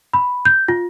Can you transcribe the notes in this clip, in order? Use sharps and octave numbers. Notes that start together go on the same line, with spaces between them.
B5
G6
F4